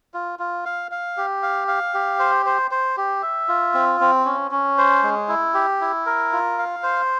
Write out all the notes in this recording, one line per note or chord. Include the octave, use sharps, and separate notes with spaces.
F4
F4
F5
F5
G4
F5
F5
G4
C5
C5
C5
G4
E5
F4
C4
C4
C#4
C#4
C5
G#3
E4
G4
E4
A#4
F4
F5
C5